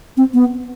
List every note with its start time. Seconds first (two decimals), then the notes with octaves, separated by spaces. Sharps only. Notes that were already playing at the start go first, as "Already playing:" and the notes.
0.17 C4
0.34 B3